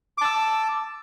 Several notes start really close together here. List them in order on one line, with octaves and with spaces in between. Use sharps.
D6 A5 E6